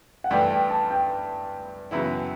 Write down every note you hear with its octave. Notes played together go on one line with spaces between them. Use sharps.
F#5
G2 E3 A3 D4 G5
G5
A5
G5
F#2 C#3 E3 B3 E4